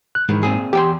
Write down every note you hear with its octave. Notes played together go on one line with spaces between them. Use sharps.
F#6
G#2 D#3 E3
A#2 C4 G#4
E2 G4 G5 C6